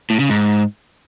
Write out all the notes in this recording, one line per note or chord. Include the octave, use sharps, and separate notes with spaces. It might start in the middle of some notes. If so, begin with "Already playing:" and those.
A2
C#3
G#2